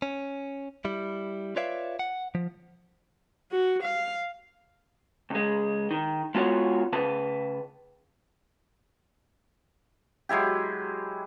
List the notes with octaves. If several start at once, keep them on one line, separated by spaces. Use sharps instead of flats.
C#4
G3 E4
F4 B4 C#5 D5 E5 F5
F#5
F3
F#4
F5
C#2 G#3
D#3
G#3 B3 F4 F#4 B4 C#5
C#3 B4 A5
F#3 G#3 E4 G4